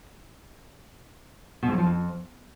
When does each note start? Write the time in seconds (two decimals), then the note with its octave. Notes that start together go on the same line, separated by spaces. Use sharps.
1.63 B2
1.68 G#2
1.73 F#3
1.78 F3
1.83 F2